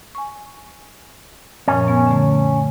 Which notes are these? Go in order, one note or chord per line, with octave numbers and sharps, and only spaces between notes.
G#5 C#6
F#2 A#2 F3 C#4
B3
D3 A3